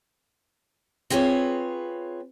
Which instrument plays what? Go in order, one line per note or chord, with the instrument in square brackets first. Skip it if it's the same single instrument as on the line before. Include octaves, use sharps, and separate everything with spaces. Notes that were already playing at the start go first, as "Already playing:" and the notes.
[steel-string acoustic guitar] C4 F4 G#4 B4 C#5